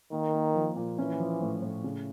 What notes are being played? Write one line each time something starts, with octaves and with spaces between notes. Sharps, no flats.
D#3 A#3
A#3
F3
A#2
E3 C#4
F3
A2
A2
C#3